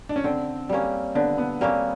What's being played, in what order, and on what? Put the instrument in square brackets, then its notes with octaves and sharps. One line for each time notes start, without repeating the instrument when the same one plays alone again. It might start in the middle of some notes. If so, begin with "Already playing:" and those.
[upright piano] D4
C#4
[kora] D3 [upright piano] C4
[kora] G3 A#3 C#4
[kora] D3 [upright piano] B3
[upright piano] B3
[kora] G3 A#3 C#4 [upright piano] C4